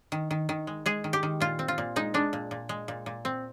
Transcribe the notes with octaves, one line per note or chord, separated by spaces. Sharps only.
D#3
D#3
D#3
G#3
G#3 G#4
D#3
G4
D#3
A#2 F4
C4
F4
A#2
G#3 D#4
G#3 D4
A#2
A#2
G#3
A#2
A#2
C4